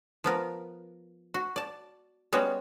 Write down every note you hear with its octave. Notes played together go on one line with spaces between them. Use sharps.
F3 B3 A#4
F#4
D5 A5
G3 G#3 B3 C#4 F#4